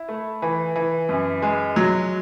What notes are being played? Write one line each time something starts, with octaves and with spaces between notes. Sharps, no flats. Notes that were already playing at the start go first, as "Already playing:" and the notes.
Already playing: E4
A3
E3
E3
F#2
G#3
F#3